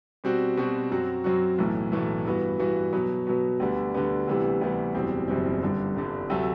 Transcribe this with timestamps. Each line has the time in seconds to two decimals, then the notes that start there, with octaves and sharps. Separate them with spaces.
0.24 B2 G3 C4 F#4
0.57 B2 G3 C4 F#4
0.91 F#2 F#3 C4 F#4
1.24 F#2 F#3 C4 F#4
1.58 B1 A2 E3 A3
1.92 B1 A2 E3 A3
2.25 G2 E3 B3 F#4
2.59 G2 E3 B3 F#4
2.93 B2 F#3 B3
3.27 B2 F#3 B3
3.60 D2 D3 G3 B3
3.94 D2 D3 G3 B3
4.28 D2 C3 E3 G3 B3
4.61 D2 C3 E3 G3 B3
4.95 F#1 E2 B2 G3 C4
5.28 F#1 E2 B2 G3 C4
5.62 G1 G2 D3 G3
5.96 G1 G2 D3 G3
6.30 D2 C3 F#3 A3